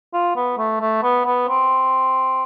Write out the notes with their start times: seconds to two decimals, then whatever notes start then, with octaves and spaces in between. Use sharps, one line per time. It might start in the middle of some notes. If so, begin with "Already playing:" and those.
0.13 F4
0.36 B3
0.58 A3
0.80 A3
1.03 B3
1.26 B3
1.48 C4